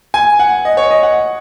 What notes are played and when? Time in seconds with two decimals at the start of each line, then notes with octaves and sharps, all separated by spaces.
0.14 G#5
0.39 F#5
0.65 D#5
0.77 C#5
0.91 D#5
1.03 F#5